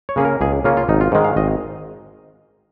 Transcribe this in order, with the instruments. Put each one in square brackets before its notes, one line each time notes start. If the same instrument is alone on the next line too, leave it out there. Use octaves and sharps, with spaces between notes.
[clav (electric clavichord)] C#5
C#3 A#3 C#4 G#4
A#4
C#2 G#4
C#3 A#3 C#4 F4
F4
G#1 D#4
F4
G#2 D#3 G#3
F5
G#1 D#5